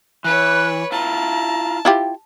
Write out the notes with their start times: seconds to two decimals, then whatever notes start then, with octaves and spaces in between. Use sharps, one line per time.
0.24 E3 B4 C#5 F#6
0.92 E4 F4 A5 A#5
1.85 E4 F4 G4